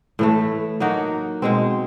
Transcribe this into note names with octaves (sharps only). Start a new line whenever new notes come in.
A2 E3 A3
F#3 A#3 D#4 F#4
B2 G#3 C4